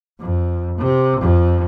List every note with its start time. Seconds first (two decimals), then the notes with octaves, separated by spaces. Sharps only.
0.20 F2
0.78 C3
1.19 F2